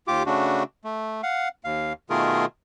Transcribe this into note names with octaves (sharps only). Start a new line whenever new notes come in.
D#2 F4 G4 D6
C#3 A3 D4 F#4
A3
F5 F#5
D#2 F5
B2 D#3 A3 F4 G#4 A#4